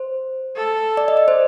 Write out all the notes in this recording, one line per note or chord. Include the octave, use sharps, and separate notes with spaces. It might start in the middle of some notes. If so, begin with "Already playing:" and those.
Already playing: C5
A4
D5
D#5
D5
C5